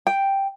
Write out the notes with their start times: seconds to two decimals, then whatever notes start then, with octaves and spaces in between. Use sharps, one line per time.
0.07 G5